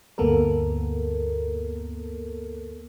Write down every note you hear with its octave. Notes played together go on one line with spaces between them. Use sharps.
D2 G2 A#3 B3 A4 A#4